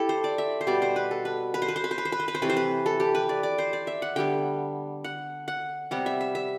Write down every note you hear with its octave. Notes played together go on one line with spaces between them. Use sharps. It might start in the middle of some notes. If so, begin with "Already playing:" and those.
Already playing: E4 G4 A4
C5
D5
E5
C5
B2 G3 B3 D5
C5
B4
A4
B4
B4
C5
B4
C5
B4
C5
B4
C5
B4
C5
B4
C5
C3 E3 A3 B4
C5
B4
A4
G4
B4
D5
D5
C5
D5
E5
F#5
D3 G3 B3 G5
F#5
F#5
C3 G3 B3 F#5
E5
E5
E5